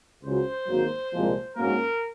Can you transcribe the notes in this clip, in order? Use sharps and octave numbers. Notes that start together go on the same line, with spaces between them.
C#2 C#3 F#3 C5
G#1 G#2 F#3 A#3
C2 A#2 F3 G#3
G#2 F#3 A#3 C#4 A#4